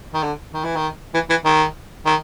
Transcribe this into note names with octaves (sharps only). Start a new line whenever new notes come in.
D#3
D3
D#3
E3
D#3
E3
E3
D#3
D#3